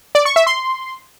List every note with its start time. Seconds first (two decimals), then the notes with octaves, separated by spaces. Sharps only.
0.15 D5
0.25 C#6
0.36 E5
0.47 C6